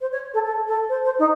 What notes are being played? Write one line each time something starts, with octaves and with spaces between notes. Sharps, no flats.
C5
C#5
A4
A4
A4
C5
C5
D#4